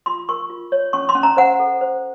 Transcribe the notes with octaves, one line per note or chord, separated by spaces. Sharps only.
F4 C6
A#4 C#6
F4
C#5
C#4 C#6
C6
C#4
A#5
C5 F#5
A4
C5